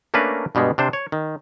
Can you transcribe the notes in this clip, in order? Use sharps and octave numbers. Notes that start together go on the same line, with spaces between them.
A3 A#3 C#4 D4 A#4 B4
G2 B2 G3 G#3
C3 D4 C5
C#5
D#3